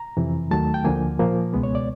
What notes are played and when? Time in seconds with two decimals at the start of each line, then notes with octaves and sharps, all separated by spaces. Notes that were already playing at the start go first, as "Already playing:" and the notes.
Already playing: A#5
0.17 F2 C3 E3
0.51 D#2 D#3 F#3 A3 A5
0.74 G5
0.85 D2 D3 F3 A#3 G#5
1.20 A#2 F3 A#3
1.54 C#2 B2 G#3 B3
1.63 C#5
1.75 D5